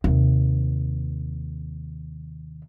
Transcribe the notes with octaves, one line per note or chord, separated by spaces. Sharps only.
D#2 C3